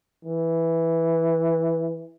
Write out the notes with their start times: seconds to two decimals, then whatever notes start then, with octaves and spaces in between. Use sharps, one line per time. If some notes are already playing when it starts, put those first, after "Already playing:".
0.25 E3